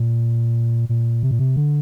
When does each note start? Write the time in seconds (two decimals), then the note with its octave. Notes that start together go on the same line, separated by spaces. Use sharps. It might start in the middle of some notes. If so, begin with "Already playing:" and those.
Already playing: A#2
0.89 A#2
1.23 C3
1.31 A#2
1.39 C3
1.56 D3